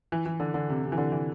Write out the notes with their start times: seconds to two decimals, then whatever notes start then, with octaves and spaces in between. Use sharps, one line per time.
0.12 E3
0.26 E3
0.40 D3
0.54 D3
0.69 C3
0.83 C3
0.92 E3
0.98 D3
1.12 E3